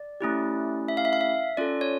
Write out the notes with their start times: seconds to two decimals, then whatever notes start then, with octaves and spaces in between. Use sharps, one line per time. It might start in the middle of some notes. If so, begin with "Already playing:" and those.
Already playing: D5
0.21 A3 C#4 E4 G4
0.88 E5
0.97 F5
1.05 E5
1.13 F5
1.21 E5
1.57 C#4 F4 A4 D5
1.81 C#5